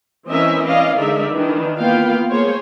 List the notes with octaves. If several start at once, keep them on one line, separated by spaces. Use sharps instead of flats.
E3 C4 C#4 A#4 D#5 E5
E3 C#4 D5 D#5 F5
D3 G#3 D#4 A#4 D5 E5
D#3 E3 D4
A#3 B3 F4 F5 G5
A#3 G#4 C5 C#5